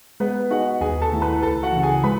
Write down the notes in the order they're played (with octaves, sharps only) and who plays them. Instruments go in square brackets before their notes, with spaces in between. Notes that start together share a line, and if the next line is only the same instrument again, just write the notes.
[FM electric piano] G#3 [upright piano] B3 B4
[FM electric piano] D#4 G#4 D#5 [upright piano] F#4 F#5
[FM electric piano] D#2 [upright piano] G#4 G#5
[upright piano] A4 A5
[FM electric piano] D#3 A3 E4
[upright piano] B4 B5
[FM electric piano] C#2 [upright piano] A4 A5
[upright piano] F#4 F#5
[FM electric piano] C#3 E3
[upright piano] G#4 G#5
[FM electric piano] G#3 [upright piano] B4 B5